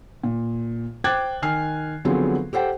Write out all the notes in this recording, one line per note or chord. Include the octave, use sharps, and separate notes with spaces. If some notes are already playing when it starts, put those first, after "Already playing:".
A#2
C5 G5 D6 F#6 G#6 A6
D#3 G#5 F6 C7
D3 F3 F#3 B3 C4 G#4
G4 A4 C5 F#5 G5